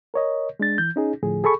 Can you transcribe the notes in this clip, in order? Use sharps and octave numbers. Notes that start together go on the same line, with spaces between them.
A#4 C#5 D#5
G#3 D4 A6
E3 G6
C#4 D#4 G#4
A2 D3 F3 G#4
G#4 A4 B5 C#6